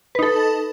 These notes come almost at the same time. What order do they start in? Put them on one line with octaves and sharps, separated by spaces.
B4 D#4 A4